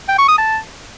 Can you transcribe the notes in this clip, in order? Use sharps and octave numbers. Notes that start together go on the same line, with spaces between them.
G5
C#6
D#6
A5